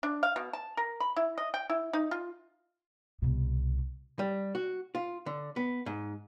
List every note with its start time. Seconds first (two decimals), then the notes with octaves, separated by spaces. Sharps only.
0.03 D4
0.23 F5
0.36 B2
0.53 A5
0.77 A#4
1.00 B5
1.16 E4
1.38 D#5
1.54 G5
1.70 E4
1.93 D#4
2.11 F4
3.22 C2 B2
4.19 G3
4.55 F#4
4.95 F4
5.26 D3
5.56 B3
5.86 G#2